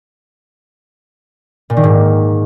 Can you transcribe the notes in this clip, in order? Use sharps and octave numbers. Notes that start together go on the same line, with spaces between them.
A#2
D#3
G#2